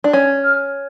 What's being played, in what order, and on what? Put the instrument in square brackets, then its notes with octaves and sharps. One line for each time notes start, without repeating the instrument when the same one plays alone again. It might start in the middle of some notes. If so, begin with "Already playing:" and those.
[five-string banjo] D4
C#4
[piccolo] F6